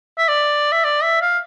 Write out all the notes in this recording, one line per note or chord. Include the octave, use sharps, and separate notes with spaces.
E5
D5
E5
D5
E5
F5